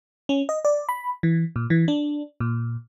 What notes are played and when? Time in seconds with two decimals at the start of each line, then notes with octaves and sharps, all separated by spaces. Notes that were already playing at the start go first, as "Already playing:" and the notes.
0.29 C#4
0.49 D#5
0.65 D5
0.89 B5
1.23 E3
1.56 A#2
1.70 E3
1.88 D4
2.40 A#2